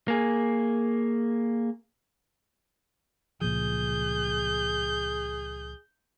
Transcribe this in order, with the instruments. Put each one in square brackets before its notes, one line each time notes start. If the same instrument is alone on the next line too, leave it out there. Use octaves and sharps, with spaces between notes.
[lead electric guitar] A#3 G#4
[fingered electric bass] C#2 A#2 F3 [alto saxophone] G#4 [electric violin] G6